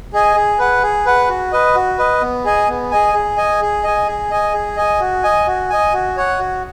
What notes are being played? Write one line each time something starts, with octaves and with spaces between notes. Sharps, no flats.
G#4 D#5 G#5
G#4
B4 F#5
G#4
B4 F#5
F#4
B4 D#5
F#4
B4 D#5
B3
G#4 D#5 G#5
B3
G#4 D#5 G#5
G#4
D#5 G#5
G#4
D#5 G#5
G#4
D#5 G#5
G#4
D#5 G#5
F#4
D#5 G#5
F#4
D#5 G#5
F#4
C#5 F#5
F#4